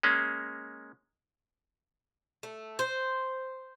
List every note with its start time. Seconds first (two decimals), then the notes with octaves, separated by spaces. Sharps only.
0.03 G#3 A#3 C#4
2.43 A3
2.79 C5